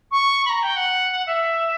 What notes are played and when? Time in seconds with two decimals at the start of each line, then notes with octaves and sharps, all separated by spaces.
0.11 C#6
0.45 B5
0.49 A#5
0.62 G5
0.76 F#5
1.26 E5